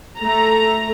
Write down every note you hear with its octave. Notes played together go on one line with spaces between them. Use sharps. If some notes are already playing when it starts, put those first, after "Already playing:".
A3 A#5